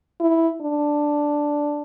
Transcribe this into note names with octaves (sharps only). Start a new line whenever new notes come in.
E4
D4